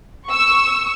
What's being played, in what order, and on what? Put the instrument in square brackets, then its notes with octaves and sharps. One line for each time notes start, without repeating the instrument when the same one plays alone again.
[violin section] C#6 E6